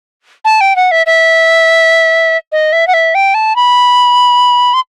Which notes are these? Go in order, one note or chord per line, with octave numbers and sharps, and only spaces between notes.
A5
G5
F#5
E5
E5
D#5
E5
F#5
E5
G5
A5
B5
C6